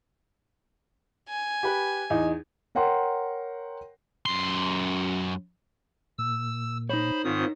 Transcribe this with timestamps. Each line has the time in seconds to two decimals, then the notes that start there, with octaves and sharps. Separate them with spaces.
1.29 G#5
1.63 G4 B4
2.10 E2 D#4
2.75 A#4 C#5 F#5 G5 A#5 C6
4.26 F#2 C6
6.18 A#2 E6
6.90 D#4 C5 C#5 B5
7.24 G#2 D#3 C4 F4 D#6